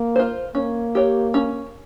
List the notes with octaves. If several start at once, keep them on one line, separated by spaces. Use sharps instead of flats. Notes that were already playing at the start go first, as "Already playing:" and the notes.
Already playing: A#3
F4 C5
A#3 C#4
G4 C#5
C#4